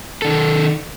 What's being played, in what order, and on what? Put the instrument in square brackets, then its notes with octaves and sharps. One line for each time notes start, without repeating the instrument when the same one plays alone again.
[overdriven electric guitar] D#3 A4